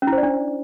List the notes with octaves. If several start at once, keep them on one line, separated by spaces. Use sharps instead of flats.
C#4
E4
C5
D5
D4